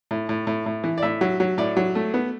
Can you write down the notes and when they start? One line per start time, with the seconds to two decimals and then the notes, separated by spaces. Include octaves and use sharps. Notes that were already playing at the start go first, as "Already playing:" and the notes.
0.11 A2
0.29 A2
0.47 A2
0.66 A2
0.84 E3
0.98 D5
1.03 A2 E5
1.21 F#3
1.40 F#3
1.58 A2 D5
1.77 F#3
1.95 A3
2.14 B3